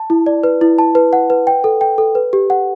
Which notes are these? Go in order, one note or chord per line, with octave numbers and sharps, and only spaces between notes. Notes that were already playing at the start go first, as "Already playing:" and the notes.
Already playing: A5
E4
D5
B4
E4
A5
B4
F#5
B4
G5
A4
G5
A4
B4
G4
F#5